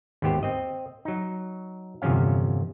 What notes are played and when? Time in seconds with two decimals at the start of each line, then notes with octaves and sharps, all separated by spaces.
0.22 G#1 D#2 B3 G4 C5
0.43 C4 D#5
1.05 F#3 D#4
2.02 G1 E2 C3 F3 C#4 F5